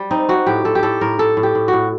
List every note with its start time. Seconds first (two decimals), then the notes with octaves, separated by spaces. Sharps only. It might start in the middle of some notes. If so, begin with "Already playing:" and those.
Already playing: G3
0.11 C4 D#4
0.28 C4 F#4
0.46 A2 G4
0.65 A2 A4
0.75 G4
0.83 A2 A4
1.01 A2 A#4
1.19 A2 A4
1.37 A2
1.43 G4
1.55 A2
1.68 A2 F#4